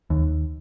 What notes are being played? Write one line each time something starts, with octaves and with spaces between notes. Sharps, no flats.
D#2